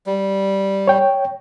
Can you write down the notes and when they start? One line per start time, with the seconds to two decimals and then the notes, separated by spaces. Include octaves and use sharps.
0.06 G3
0.88 C#5 G5